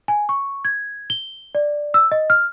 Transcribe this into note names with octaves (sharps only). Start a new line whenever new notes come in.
G#5
C#6
G#6
G7
D5
E6
D#5
F6